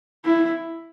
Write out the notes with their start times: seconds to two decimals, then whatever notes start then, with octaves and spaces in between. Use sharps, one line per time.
0.25 E4